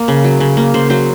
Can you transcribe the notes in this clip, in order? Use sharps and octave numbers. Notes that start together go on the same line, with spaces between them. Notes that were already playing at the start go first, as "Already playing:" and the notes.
Already playing: A#3
C#3
F#3
C#3
A#3
C#3 C5
F#3 C5